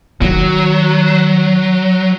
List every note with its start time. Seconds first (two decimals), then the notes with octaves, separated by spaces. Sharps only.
0.22 D#3 F#3